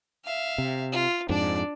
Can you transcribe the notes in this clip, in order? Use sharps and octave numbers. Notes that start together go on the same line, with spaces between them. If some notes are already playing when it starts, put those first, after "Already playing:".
E5 F5
C3
F4
F2 G#2 D4 D5